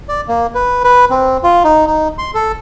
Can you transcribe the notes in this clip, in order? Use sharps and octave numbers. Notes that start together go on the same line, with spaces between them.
D5
A#3
B4
B4
C4
F4
D#4
D#4
C6
A4